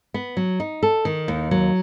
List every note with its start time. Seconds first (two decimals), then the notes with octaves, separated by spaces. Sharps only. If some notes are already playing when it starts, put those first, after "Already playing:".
0.14 B3
0.37 F#3
0.60 D#4
0.83 A4
1.05 D#3
1.28 D#2
1.51 F#3